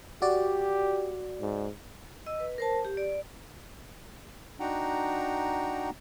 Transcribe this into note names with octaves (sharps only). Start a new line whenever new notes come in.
F#4 G4 D5
G#2
D#5 E6
B4
A#4 C5 A5
G4
D5
D4 D#4 F#4 F#5 G5 A#5